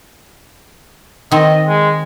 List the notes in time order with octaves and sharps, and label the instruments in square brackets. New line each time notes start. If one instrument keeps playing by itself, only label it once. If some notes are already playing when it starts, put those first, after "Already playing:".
[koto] D#3 C4 [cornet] D#5
[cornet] G#3